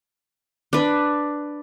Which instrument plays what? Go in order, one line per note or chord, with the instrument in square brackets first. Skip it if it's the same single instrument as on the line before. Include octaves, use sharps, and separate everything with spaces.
[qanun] D4 B4